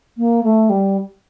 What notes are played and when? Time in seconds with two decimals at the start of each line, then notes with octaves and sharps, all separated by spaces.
0.18 A#3
0.43 A3
0.69 G3